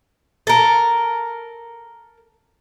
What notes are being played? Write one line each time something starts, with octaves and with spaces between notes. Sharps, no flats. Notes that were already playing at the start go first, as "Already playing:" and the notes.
A4 A#4